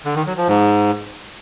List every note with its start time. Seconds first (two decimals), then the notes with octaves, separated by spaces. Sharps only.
0.05 D3
0.16 D#3
0.27 F#3
0.37 F3
0.48 G#2